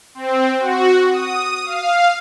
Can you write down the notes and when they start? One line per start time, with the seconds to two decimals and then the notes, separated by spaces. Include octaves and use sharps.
0.15 C4
0.60 F#4
1.10 D#6
1.66 F5